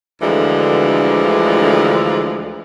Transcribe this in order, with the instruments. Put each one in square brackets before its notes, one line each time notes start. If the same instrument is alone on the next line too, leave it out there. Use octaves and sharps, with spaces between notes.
[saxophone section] D2 D3 E3 F3 G#3